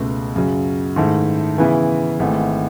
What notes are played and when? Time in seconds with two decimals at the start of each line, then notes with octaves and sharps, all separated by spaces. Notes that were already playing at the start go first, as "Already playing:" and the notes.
Already playing: C#2 B2 A3
0.36 F#2 C#3 F#3
0.96 G#2 D#3 A3 E4 A4
1.58 C#3 E3 B3 E4
2.19 G#1 G#2 E3 A3